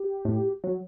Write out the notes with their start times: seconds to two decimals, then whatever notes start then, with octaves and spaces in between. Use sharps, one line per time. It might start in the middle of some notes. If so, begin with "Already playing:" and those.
Already playing: G4
0.25 A2
0.64 F#3